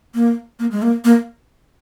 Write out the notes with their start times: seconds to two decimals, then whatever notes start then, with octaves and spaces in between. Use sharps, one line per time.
0.15 A#3
0.59 A#3
0.71 G#3
0.82 A#3
1.05 A#3